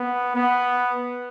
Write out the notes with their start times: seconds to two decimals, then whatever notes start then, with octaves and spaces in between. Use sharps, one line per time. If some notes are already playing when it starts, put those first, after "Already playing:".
Already playing: B3
0.36 B3